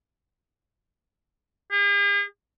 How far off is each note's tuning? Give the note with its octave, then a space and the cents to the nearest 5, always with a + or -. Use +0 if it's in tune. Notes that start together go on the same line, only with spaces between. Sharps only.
G#4 -45